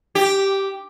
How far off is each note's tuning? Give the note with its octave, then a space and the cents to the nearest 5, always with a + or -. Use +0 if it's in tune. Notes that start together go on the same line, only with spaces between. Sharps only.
G4 -5